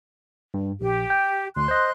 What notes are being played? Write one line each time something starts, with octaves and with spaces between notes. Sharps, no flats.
G2
A#1 G4
G5
D2 C6 F#6
C5 D#5